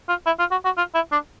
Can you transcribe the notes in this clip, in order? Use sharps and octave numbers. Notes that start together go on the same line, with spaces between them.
F4
E4
F4
F#4
F#4
F4
E4
D4